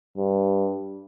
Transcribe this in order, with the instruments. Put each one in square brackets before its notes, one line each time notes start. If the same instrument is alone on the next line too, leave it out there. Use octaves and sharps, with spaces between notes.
[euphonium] G2